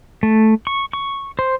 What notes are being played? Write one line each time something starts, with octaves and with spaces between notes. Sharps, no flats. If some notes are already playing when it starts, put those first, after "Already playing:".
A3
C#6
C#6
C5